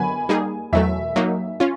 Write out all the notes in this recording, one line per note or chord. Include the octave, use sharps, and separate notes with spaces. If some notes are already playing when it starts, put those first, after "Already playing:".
Already playing: D3 F#3 B3 G#5 B5
G3 A#3 D#4 G#4
E2 B2 F#3 A3 E5
F#3 A#3 D#4
C#4 F4